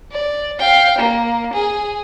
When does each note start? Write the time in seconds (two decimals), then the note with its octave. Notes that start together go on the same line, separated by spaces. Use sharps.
0.11 D5
0.59 F5 G5
0.98 A#3
1.53 G#4